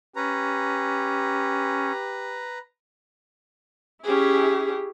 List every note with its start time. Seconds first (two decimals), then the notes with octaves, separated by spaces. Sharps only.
0.16 C#4 G4 B4 A#5
4.04 C#4 E4 G4 G#4